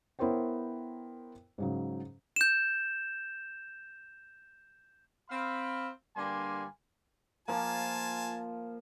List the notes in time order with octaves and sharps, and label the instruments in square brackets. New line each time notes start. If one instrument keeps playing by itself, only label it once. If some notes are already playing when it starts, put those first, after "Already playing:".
[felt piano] B3 E4 A#4 C5 C#5 G5
G#2 C#3 F#3
[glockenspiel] G6 E7
[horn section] C4 F5 B5
G2 D3 G3 A#3 G#5 C6
[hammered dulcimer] F3 A#3 [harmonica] F4 G#5 A5